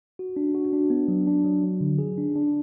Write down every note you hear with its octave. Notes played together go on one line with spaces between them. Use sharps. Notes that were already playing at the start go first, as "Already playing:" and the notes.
F#4
D4
F#4
D4
B3
F#3
D4
F#3
F#3
D3
G#4
D4
D4